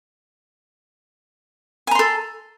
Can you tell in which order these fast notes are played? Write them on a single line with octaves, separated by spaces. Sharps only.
G#5 A#5 C6 A4